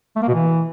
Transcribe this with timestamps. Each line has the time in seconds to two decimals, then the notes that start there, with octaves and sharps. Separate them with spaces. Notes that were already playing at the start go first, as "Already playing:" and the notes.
0.16 A3
0.22 A#3
0.28 B2
0.35 E3